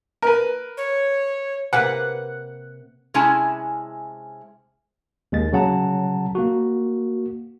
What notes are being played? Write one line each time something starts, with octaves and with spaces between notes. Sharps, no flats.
A#4 B4
C#5
C3 A#3 B4 F#5
C3 G#3 C#4 E4 G#5 A5
D#2 G#3 A6
C#3 F#3 F#5 A5 A#5
A#3 F#4